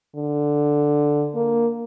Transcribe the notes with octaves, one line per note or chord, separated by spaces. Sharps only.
D3
A#3